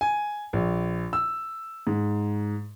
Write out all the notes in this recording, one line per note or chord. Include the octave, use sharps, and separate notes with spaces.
G#5
A#1
E6
G#2